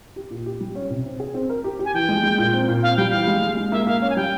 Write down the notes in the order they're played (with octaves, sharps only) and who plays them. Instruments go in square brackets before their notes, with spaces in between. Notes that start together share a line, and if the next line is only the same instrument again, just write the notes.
[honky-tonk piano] G4
A#2
G4
G3
C#4
C3
C4
G#4
C4
A#4
G4
G4
[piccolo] G#5
[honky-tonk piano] E3 [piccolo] G5
[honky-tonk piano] G#3
G#3
A#2
C4
A#2
[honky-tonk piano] C4 [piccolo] F5
[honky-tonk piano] G3 [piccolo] G5
[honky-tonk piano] E3 [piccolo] F5
[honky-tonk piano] G#3
G#3
G#3
[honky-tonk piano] A#3 [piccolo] E5
[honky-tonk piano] A#3 [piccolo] F5
[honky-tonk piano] C#4 [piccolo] F5
[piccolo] G#5
[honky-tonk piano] G3 [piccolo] G5